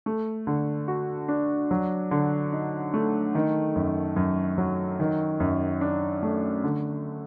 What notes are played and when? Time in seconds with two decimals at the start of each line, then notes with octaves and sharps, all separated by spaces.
0.06 A3
0.47 D3
0.88 F#4
1.28 D4
1.71 F#3
2.11 D3
2.52 D#4
2.94 A3
3.35 D#3
3.76 F#2
4.16 F#2
4.58 F#3
5.00 D#3
5.40 F#2
5.81 D4
6.23 A3
6.64 D3